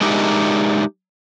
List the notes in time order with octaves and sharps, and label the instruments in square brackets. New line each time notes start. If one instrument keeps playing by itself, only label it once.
[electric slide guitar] G#3 D4 D#4 G4 A#4 E5